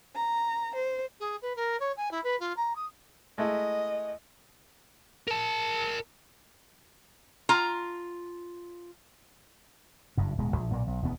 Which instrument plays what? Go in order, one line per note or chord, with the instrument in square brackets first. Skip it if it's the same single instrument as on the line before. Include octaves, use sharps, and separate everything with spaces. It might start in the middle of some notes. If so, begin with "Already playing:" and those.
[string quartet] A#5
C5
[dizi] G#4
B4
A#4
C#5
G#5
E4
B4
F4
A#5
D#6
[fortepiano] G#3 A3 E4 [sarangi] D#5
[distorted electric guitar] A#4 A5
[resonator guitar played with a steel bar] F4 A#5
[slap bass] F#1 G2
D1 B2 G#3
A#1 F3
B1 A#2 A#3
B1
E1 D2 B3